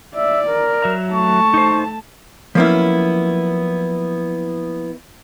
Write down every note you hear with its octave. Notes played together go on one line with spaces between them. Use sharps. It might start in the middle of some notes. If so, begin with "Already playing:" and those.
D5 E5
A#4
F#3 E5 A#5
A3 A5 C#6
D#4 C5
F3 F#3 A#3 B3 C#4 E4